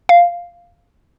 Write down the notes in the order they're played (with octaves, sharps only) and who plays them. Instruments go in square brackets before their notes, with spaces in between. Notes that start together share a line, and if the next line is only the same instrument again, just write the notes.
[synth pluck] F5